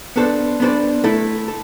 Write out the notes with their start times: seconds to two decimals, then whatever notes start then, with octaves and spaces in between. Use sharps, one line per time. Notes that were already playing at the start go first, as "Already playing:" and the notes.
0.16 B3 D4 A4 C5
0.60 B3 D4 A4 C5
1.04 A3 E4 A4
1.48 A4